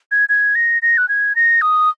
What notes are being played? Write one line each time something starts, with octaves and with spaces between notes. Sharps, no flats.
G#6
G#6
A#6
A#6
F#6
G#6
A#6
D#6